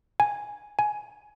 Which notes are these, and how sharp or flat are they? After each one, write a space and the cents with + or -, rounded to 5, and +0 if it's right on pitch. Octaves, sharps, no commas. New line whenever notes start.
G#5 +0
G#5 +15